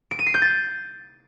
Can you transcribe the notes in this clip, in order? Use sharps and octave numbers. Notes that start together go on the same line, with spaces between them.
D7
D#7
C7
G6
A6